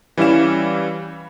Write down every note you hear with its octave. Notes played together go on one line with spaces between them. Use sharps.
E3 G3 C#4 E4 F5 E7